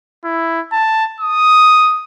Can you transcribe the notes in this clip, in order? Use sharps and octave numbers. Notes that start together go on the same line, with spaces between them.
E4
A5
D#6